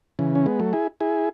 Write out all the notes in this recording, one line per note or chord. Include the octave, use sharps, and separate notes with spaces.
C#3 E3
C#4
G#3 B3
F#3 A3
E4 G#4
E4 G#4